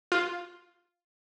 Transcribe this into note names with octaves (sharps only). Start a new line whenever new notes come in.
F4